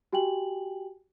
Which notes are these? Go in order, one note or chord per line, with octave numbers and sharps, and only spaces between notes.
F#4 G4 G5 G#5 F#7